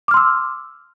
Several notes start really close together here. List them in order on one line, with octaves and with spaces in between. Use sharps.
D6 F6 C6 E6